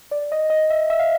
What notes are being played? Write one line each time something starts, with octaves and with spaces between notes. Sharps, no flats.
D5
D#5
D#5
E5
E5
F5